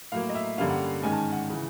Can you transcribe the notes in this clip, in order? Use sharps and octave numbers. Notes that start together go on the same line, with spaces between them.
A2 F#3 A#3 F5
D#5
E5
G2 D3 G3 A#3 C#4 F5
F#5
G#2 D#3 G#3 C#4 G#5
A5
G#5
F#5
C#3 E3